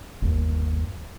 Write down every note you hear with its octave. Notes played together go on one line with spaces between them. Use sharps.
G1 D#2